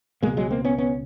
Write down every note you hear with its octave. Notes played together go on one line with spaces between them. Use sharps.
C#2 B2 G#3 A#3
F#3 G#3
A#3 C4
B3 C#4
B3 C#4